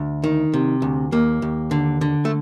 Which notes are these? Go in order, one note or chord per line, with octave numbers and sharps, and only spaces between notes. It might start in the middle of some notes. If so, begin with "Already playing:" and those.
Already playing: D2
D#3
C3
D2
D#2 A#3
D#2
D3
D3
A3